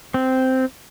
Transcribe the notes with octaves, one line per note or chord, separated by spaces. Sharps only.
C4